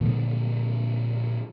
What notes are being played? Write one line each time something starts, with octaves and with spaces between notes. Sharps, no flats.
A#2 D3 F3 G3